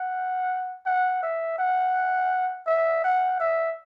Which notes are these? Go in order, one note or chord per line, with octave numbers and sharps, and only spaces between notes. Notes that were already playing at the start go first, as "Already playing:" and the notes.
Already playing: F#5
F#5
E5
F#5
E5
F#5
E5